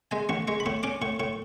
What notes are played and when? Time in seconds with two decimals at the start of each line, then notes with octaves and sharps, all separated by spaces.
0.11 G#3 G#5
0.29 A1 C#6
0.47 G#3 C#6
0.60 B5
0.66 A2 C#6
0.83 C#4 D6
1.02 A2 C#6
1.20 A2 C#6